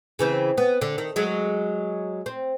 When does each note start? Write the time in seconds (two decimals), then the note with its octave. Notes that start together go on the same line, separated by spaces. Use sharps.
0.19 C#3 E3 C4
0.58 B3
0.81 D3
0.98 D#3
1.16 F#3 G#3
2.26 C4